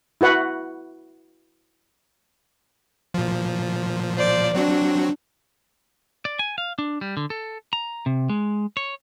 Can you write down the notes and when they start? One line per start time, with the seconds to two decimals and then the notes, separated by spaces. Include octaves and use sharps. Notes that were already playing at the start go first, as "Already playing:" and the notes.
0.21 E4 F#4 B4 F#5
3.14 A#2 F3
4.16 C5 D5
4.54 F#3 C4 D4 F#4
6.25 D5
6.39 G#5
6.58 F5
6.79 D4
7.01 G3
7.17 D3
7.30 A4
7.73 A#5
8.06 C3
8.29 G#3
8.77 C#5